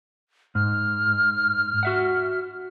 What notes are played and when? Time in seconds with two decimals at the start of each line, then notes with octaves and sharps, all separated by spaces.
0.55 G#2 F6
1.83 F#4 E5 F#5